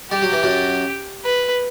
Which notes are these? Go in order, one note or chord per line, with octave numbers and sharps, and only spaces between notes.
G3 G4
F#3
E3
F#2 F#3
B4